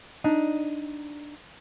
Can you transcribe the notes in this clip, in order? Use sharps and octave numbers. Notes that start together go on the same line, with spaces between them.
D4 D#4